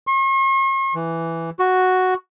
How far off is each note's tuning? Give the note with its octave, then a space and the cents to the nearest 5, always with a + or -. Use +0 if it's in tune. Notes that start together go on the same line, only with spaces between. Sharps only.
C#6 -45
E3 +5
F#4 +0